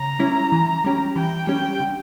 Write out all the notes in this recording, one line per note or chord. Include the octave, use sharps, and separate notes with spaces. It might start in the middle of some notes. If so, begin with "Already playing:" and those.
Already playing: C#3 A#5
G3 C#4 E4
E3
G3 C#4 G4
E3 G5
G3 C#4 G4 G5
D3